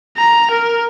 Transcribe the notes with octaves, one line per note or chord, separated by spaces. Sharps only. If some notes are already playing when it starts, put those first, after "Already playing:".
A#5
A#4